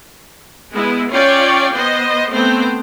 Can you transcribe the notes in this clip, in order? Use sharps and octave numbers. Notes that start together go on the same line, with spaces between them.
G#3 B3 E4
C#4 F4 C#5 D5 G5
B3 C5 D#5
A3 B3 C4 C5 G5